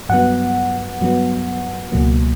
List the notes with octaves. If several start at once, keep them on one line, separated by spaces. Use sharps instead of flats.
G2 F#3 B3 F#5
G2 F#3 B3
C#2 B2 F#3 A#3